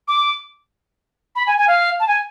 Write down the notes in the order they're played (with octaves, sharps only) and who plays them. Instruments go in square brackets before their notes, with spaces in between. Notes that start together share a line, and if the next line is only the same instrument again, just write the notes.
[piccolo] D6
B5
G#5
G#5
F5
A5
G#5